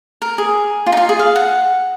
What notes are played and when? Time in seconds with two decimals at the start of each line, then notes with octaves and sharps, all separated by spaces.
0.22 A#4
0.38 G#4
0.86 F4
0.92 D#4
0.97 F4
1.09 G#4
1.19 F5
1.36 F#5